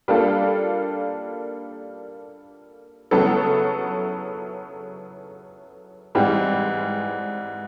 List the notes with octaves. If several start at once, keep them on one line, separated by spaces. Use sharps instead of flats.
G3 A#3 D4 F4 A4
C#3 F#3 B3 E4 A4
G#2 E3 G3 C4